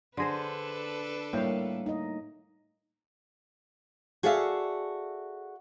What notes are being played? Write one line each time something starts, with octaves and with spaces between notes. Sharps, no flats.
D3 D4 G#4 A4 B4 C5 C6 A#6
A2 G3 A#3 F5 G6
D#4 D#5
F#4 G#4 A4 D5 E5 F5